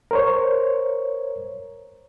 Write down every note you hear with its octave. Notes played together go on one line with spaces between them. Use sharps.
A#4 C5 C#5